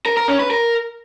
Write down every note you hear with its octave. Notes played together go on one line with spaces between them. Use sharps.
A#4
A#4
C#4
B4
A#4